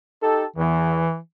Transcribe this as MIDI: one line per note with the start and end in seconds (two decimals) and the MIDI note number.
0.22 0.45 63
0.22 0.45 67
0.22 0.45 69
0.56 1.05 40
0.56 1.18 52